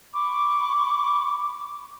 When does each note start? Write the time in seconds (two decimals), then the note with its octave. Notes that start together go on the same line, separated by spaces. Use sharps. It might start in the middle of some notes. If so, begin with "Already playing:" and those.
0.13 B5 C#6 D6